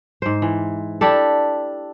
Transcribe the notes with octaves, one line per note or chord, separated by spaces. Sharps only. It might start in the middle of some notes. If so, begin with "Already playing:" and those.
G#2 C5
E3
D4 E4 G4 A4